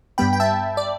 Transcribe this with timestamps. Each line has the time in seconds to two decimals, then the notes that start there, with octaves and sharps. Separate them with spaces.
0.18 G2 G3 B3 G5 B5
0.33 G5
0.40 E5 A5
0.77 D5